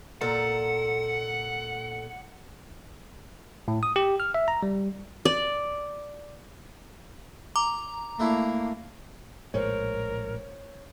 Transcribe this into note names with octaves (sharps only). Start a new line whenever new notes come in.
A#2 A4 F#5 A#5
A2
D#6
G4
F6
E5
A#5
G3
D5
A#5 D6
A3 A#3 D4 E4
A#1 A2 G#3 A#4 C5 C#5